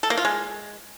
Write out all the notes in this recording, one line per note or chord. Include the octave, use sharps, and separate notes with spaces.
A4
A#3
F4
G#3